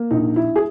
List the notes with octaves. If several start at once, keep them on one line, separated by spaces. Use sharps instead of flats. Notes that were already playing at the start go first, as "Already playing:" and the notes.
Already playing: A#3
A#1 D#4
E4
G#4